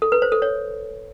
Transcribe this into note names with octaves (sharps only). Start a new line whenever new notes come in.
A4
B4
C5
A4
C#5